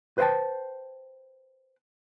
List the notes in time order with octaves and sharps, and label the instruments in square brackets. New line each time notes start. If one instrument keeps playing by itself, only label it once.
[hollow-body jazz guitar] B4 C5 D#5 G5 A5